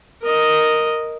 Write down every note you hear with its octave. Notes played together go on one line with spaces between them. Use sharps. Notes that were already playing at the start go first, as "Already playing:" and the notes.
A#4 D#5